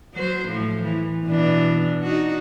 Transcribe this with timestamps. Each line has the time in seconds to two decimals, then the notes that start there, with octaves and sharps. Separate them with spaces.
0.14 F#3 C5
0.48 A2 F3
0.83 E3
1.25 B2 E3 D4
2.03 D#4 F#4